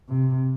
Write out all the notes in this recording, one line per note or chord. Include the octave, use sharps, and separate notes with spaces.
C3